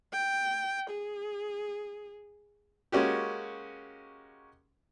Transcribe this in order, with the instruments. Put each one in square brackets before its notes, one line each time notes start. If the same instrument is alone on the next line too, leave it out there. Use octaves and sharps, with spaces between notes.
[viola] G5
G#4
[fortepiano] G#3 A#3 C#4 F#4 G4